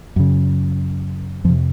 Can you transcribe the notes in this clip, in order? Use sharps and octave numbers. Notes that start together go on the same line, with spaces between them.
F#2 C#3
F2 C3 F3